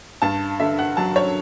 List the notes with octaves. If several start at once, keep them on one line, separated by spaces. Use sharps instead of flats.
G2 A5
D3 E5
F#5
F#3 A5
C#5